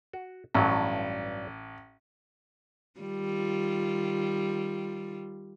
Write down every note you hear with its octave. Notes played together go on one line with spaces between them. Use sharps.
F#4
A1 G2 F#3
D#3 G3 F4